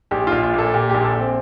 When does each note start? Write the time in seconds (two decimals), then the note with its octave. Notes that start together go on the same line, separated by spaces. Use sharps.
0.11 A#1 G4
0.27 F4
0.32 A#1
0.43 F4
0.53 A#2
0.58 A4
0.74 A#2 G4
0.89 G4
0.95 A#1
1.04 A4
1.15 A#1 C4